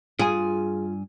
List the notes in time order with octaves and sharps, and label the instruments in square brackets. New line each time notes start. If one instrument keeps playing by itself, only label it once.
[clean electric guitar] G2 G#5 [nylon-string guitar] F4 [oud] G#4